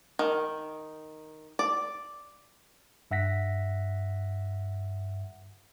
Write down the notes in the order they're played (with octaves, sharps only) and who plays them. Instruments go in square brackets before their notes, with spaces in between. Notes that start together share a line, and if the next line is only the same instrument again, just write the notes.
[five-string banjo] D#3
D5
[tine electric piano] G2 E5 F#5 A#6 B6